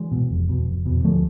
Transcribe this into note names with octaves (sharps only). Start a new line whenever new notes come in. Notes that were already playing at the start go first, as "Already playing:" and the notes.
Already playing: E3 G#3
B2
F1
E2 B2
F1
E2 B2
D2 F3 A3